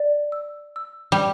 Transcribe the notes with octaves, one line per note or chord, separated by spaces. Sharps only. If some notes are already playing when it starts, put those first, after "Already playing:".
Already playing: D5
E6
E6
G3